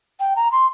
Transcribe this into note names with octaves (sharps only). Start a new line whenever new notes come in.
G5
A#5
C6